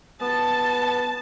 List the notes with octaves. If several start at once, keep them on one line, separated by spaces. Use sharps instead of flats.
B3 A5